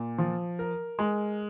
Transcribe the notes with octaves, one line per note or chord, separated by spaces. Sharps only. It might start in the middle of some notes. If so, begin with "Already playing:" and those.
Already playing: A#2
F3
A#4
G#3